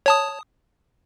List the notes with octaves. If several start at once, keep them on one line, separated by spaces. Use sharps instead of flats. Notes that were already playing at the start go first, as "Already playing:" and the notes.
C#5 A5 D#6